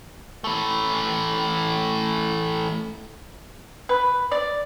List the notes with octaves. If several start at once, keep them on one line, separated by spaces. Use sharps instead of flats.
E3 A3
B4
D5